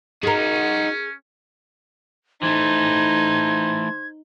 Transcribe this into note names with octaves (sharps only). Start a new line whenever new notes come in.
C#4 D#4 F#4 G#4 A#4
E3 A3 D#4 C5 G#6